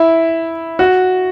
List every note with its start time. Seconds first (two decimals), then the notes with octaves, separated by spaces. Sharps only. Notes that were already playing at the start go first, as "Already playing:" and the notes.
Already playing: E4
0.79 F#4